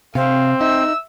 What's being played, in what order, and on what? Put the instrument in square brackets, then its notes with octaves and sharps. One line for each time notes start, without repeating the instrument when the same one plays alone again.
[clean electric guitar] C3 [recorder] C4 [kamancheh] F5
[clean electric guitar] D#4 [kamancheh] E5 E6